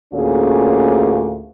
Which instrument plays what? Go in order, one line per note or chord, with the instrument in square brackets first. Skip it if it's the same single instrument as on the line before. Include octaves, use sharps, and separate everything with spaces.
[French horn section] D2 A2 A#3 C#4 F4 G#4